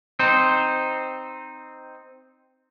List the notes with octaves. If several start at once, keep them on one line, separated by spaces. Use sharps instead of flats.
C4 D#4 C5